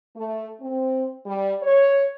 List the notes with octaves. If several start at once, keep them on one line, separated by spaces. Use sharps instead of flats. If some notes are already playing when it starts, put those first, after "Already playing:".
A3
C4
G3
C#5